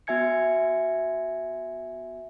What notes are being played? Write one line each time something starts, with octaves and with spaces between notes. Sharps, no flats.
B3 F#4 E5 G#5 G#6 C#7